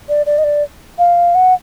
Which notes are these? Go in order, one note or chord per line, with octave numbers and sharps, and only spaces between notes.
D5
D5
D#5
D5
F5
F#5